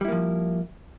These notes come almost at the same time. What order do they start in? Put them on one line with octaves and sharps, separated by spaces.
G3 E4 A#3 F3